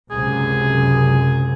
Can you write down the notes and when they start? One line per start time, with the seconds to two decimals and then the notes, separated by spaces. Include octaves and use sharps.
0.11 C#2 F#2 C3 G#4